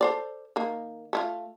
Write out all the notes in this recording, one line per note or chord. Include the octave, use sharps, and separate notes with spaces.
A4 C5 D5
D#3 A#3
A3 E4 F4